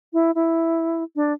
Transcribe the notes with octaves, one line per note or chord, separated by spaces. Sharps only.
E4
E4
D4